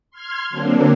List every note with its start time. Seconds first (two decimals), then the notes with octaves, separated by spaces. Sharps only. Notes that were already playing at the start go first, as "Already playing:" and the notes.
0.11 C6 F6 G#6
0.50 D3 F#3 A#3 C4 D4